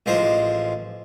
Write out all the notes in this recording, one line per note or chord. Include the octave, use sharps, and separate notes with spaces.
A1 F3 G#3 C5